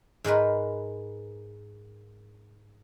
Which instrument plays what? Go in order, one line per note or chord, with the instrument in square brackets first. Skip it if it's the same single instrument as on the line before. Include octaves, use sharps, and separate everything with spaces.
[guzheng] G#2 G#3 A#4 B4